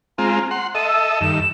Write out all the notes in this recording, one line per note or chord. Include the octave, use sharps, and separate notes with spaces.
G#3 C4 F4 A#5
F#5 C6
A4 D#5 E5 D#7
E6
G2 D#3 E7